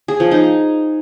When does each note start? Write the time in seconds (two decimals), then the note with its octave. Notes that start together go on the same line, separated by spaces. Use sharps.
0.08 G#4
0.20 F3
0.31 D#4